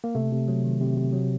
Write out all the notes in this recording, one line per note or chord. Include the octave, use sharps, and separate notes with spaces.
A#3
C3 A3
C3
F#3
D#3
C3
C3
F#3